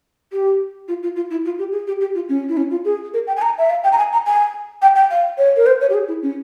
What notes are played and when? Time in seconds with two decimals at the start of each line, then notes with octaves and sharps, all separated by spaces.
0.33 G4
0.88 F4
1.03 F4
1.16 F4
1.31 E4
1.45 F4
1.59 G4
1.72 G#4
1.87 G4
2.01 G4
2.15 F4
2.29 C#4
2.49 E4
2.57 C#4
2.71 F4
2.85 G#4
3.14 A#4
3.27 G5
3.36 G#5
3.42 A#5
3.58 E5
3.70 F5
3.84 G5
3.92 A#5
3.98 G#5
4.12 A#5
4.26 G#5
4.82 G5
4.96 G5
5.11 F5
5.38 C#5
5.56 A#4
5.66 C5
5.81 C#5
5.90 G4
5.94 G#4
6.08 E4
6.23 C#4